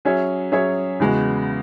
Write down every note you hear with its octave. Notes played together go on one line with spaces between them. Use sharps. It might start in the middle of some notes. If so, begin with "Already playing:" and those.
F#3 C#4 G#4 C#5 E5
F#3 C#4 G#4 C#5 E5
E2 C#3 G#3 B3 F#4